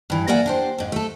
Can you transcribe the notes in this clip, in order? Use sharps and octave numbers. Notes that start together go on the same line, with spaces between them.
G2 E3
A#3 A#4 D5 E5 F#5 G#5
D4 G4 C5
F2 G#2
A3 A4